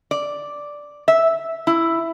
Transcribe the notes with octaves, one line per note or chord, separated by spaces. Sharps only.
D5
E5
E4